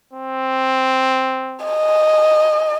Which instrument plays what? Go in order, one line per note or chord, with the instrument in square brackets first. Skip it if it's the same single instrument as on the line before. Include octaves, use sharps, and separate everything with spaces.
[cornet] C4
[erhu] D#5